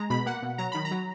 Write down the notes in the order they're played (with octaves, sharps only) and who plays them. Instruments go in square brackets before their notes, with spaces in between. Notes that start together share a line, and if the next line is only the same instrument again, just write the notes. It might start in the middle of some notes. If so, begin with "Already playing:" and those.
Already playing: [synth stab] G#3 A#5
B2 B5
A#3 F#5
B2
F#3 A#5
D#3 B5
A#5
F#3